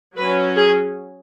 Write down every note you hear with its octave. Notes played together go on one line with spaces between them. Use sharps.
F#3 C#4 B4
G#4